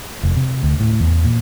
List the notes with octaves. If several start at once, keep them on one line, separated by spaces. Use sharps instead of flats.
F1
C3
D2
A2
E2
A#2